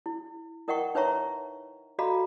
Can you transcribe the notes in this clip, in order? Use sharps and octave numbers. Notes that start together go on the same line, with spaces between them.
E4
E4 A#4 D#5 F#5 G5 C#6
D#4 B4 C#5 E5 A#5 C#6
F#4 A4 D#5 F5 A#5 B5